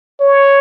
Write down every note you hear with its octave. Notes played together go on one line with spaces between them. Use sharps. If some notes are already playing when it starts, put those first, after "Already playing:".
C#5